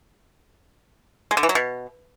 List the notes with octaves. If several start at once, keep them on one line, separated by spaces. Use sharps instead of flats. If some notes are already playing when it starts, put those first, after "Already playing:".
G#3
D3
E3
F#3
B2